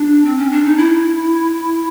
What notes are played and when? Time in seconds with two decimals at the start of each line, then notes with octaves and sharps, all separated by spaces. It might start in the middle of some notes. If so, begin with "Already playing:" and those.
Already playing: D4
0.25 C4
0.38 C#4
0.51 D4
0.65 D#4
0.78 E4